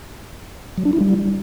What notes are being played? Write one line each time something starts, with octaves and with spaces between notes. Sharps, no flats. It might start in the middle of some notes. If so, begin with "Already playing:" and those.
F#3
D4
E4
G3